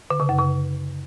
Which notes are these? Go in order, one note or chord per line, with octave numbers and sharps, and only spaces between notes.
D3
C#3
F#2
C#3